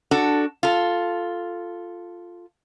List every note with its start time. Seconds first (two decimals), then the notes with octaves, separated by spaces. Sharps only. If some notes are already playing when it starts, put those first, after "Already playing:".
0.11 D4 F#4 A4
0.63 F4 A4